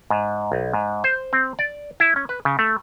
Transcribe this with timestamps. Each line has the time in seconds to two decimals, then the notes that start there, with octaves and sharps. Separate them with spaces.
0.10 G#2
0.52 B1
0.74 G#2
1.04 C5
1.33 C4
1.59 D5
2.00 E4
2.16 C#4
2.29 B4
2.45 C#3
2.59 A3